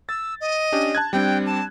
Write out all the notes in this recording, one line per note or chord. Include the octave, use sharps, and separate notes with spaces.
E6 A6
D#5
C#4 D4 G4
A5 F#6 G#6
G3 C4 D4 G5
A5